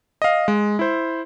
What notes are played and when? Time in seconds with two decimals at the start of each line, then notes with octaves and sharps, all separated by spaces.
0.22 D#5 F5
0.48 G#3
0.79 E4 C5